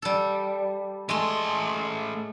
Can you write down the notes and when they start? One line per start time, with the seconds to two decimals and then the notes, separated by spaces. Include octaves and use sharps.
0.02 G3 A4
1.09 A2 G#3 A3 C6